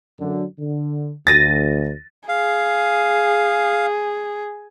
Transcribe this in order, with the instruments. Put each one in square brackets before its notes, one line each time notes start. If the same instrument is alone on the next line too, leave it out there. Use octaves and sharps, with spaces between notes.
[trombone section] F#2 D3
D3
[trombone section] D2 [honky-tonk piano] A6 A#6 D#7
[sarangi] G#4 [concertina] F5